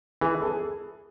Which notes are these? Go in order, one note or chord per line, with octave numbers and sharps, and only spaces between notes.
E3 G#4
A4
G#4